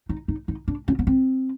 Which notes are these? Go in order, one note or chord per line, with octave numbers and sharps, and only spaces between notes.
D#4
D#4
D#4
D4
C#4
B3
C4